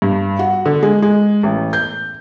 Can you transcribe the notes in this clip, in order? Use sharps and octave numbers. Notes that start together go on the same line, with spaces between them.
G2
F#4
D3
G#3
G#3
A1
G6